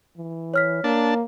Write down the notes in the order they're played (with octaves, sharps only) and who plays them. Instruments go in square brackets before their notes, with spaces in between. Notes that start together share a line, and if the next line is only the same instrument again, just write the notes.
[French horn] E3
[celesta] C#5 F6 B6
[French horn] A#3 [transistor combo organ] D4 A5